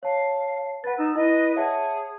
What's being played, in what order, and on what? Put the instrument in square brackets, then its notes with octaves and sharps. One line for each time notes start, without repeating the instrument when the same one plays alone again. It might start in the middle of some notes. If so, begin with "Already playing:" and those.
[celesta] C#5 A5 [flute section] F5
[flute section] B4 F#6 [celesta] F#5 A6
[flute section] D#4 E6
[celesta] E4 [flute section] B4 D#5 F#6
[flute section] G#4 C#5 [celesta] E5 F#5 A5